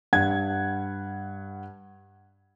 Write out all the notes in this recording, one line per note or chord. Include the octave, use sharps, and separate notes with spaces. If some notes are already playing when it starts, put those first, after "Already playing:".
G2 F#5 G#6